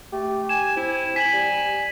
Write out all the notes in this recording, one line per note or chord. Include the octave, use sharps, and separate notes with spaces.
A3 G4
G#5 E7
C4 E4
G#5 B6 F#7
G3